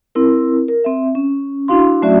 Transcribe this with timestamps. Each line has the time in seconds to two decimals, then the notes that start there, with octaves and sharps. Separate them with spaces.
0.15 C4 E4 A#4
0.68 A#4
0.84 C4 E5
1.15 C#4
1.68 D4 E4 F#4 F5 C6
2.02 F#3 A3 C#4 F#4 D5 E5